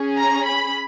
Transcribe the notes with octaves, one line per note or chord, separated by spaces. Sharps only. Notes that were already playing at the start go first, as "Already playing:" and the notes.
Already playing: C#4 G#4
A#5
B5